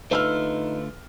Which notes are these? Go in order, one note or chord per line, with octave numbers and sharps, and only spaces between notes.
D3 A3 D#4 F4 B4 E6 F6